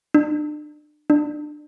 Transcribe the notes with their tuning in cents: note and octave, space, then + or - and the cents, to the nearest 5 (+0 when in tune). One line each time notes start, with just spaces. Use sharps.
D4 +35
D4 +25